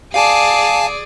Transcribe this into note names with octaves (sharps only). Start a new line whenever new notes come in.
G#4 D5 F5 G#5 A5